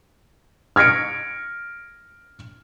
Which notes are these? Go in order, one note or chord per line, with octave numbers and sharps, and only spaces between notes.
F6 G#6 A#6 C#7 D7